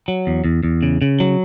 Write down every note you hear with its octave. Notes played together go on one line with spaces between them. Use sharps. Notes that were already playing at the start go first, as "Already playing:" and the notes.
F#3
E2
E2
E2
C#3
C#3
F#3